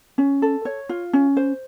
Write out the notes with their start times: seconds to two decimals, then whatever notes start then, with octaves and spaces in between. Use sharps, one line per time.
0.18 C#4
0.42 A4
0.65 C#5
0.89 F4
1.13 C#4
1.37 C5